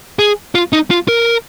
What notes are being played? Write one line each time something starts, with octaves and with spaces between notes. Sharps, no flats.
G#4
F4
D#4
F4
A#4